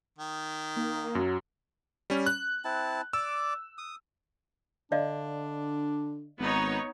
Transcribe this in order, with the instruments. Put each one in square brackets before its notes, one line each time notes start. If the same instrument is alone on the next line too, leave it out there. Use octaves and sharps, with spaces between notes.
[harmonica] D#3
[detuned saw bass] A#3 [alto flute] D#4
[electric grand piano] F#2 F#3 [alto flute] F#4
[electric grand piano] G3 C#4
F#6
[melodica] C4 E4 A5
[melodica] D5 D6 [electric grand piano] E6
[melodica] D#6
[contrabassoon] D3 [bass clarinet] D4 [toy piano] D5 D#5 F5
[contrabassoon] G#1 [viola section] B3 D#4 C#5